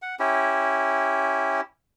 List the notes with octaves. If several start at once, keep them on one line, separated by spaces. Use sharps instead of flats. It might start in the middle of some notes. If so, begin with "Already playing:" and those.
F#5
C#4 E4 G4